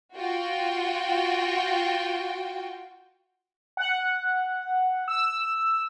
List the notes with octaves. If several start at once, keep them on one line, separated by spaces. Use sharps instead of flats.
F4 F#4 G5
F#5
E6